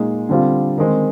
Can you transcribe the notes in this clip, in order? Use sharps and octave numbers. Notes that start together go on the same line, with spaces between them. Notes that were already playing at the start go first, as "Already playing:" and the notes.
Already playing: A#2 G#3 D#4 G#4
D3 G3 C4 F4
D#3 G#3 C4